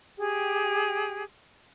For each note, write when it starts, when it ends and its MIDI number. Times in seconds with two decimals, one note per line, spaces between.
0.18 1.22 67
0.18 1.22 68
0.18 1.22 79